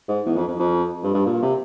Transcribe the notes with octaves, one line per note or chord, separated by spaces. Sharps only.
G#2
E2
F2
F2
F2
G2
G2
A#2
C3